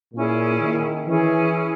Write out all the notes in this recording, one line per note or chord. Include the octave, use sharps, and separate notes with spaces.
A#2 C#4 E4 G#4
D#3
E3 C#4 E4 G#4